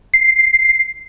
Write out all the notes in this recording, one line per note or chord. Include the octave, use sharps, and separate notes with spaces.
C7